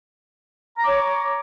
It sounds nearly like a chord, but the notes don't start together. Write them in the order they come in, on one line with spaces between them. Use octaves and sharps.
A#5 D6 C#5